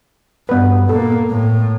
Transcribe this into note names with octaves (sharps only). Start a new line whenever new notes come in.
G2 B3 B4
A#2 A#3 A4
A2